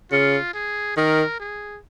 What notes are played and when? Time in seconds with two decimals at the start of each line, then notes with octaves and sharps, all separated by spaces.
0.11 C#3 F4
0.54 G#4
0.97 D#3 A#4
1.39 G#4